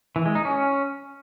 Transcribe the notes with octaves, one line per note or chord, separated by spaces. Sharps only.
E3
G#3
D#4
C#4